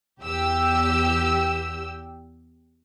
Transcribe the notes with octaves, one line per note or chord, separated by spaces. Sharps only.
E2 G4 E6